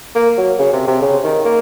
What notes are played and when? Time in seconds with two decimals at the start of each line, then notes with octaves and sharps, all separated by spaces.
0.15 A#3
0.38 F#3
0.59 C#3
0.73 C3
0.88 C3
1.02 C#3
1.24 D#3
1.45 A#3